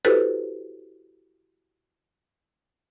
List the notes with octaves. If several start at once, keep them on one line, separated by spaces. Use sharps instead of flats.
E4 F#4 G4 A4 B4 C5